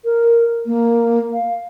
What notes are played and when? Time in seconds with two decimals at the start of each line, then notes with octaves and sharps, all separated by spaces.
0.05 A#4
0.66 A#3
1.33 F5